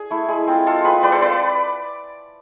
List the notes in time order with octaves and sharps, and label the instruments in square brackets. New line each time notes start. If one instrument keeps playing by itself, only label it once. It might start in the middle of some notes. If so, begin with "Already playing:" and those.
Already playing: [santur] G#4
A3 E4
G#3 G#4
C4 F4
G#3 F4 A4
C4 F4 G#4 B4
G#3 B4 D5
A4 C5
C4 F4 B4 D5